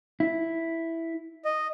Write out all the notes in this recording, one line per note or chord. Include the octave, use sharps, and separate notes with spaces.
E4
D#5